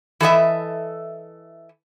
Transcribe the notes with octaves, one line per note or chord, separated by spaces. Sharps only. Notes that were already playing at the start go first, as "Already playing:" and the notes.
E3 A4 D#5 E5